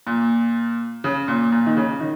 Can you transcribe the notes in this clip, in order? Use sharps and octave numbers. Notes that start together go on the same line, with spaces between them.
A#2
C#3
A#2
A#2
D#3
C#3
D#3